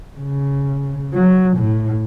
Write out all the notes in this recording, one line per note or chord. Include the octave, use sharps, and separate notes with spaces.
C#3
F#3
A2